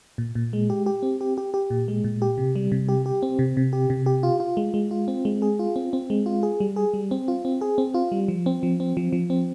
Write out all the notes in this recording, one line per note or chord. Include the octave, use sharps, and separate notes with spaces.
A#2
A#2
G#3
G4
G4
C4
G4
G4
G4
A#2
G#3
A#2
G4
C3
G3
C3
G4
G4
C4
C3
C3
G4
C3
G4
F4
F4
G#3
G#3
F4
C4
G#3
G#4
F4
C4
C4
G#3
F4
G#4
G3
G#4
G3
C4
F4
C4
G#4
C4
F4
G3
F3
C4
F3
C4
F3
F3
C4